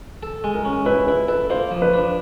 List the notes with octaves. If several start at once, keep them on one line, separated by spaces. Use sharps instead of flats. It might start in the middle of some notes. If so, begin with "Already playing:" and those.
A4
G#3
A#4
C#4
E4 B4
E4 B4
A4 B4
A#3 C5
F3
B4
D4